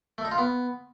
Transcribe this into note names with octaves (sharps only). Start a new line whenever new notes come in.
A3
D#4
F4
B3